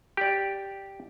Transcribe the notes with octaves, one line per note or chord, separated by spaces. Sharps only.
G4 D5